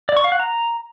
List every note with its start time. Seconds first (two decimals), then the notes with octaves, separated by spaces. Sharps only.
0.09 D5
0.17 C#6
0.24 F5
0.32 F#5
0.40 A#5